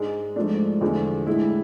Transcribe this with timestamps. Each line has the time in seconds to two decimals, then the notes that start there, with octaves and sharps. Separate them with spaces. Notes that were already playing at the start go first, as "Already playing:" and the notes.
Already playing: G#2 G#3 D4
0.36 G#2 F3 A3 D4
0.81 E2 D3 F3 G#3
1.26 A2 G#3 E4